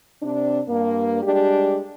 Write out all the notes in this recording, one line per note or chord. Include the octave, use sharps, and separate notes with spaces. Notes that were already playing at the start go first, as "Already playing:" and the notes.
C3 C4 D4
G2 A#3
G3 G#3 D4 G4